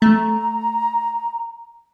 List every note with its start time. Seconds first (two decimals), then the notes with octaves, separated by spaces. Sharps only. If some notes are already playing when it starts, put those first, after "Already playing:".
0.02 A3 A#5